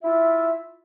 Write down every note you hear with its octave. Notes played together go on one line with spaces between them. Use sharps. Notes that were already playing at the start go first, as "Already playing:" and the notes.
E4 F4 E5